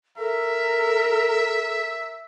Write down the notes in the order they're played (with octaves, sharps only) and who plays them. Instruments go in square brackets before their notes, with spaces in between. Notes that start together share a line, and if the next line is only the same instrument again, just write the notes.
[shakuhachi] A4 [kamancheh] A#4 [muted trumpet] E5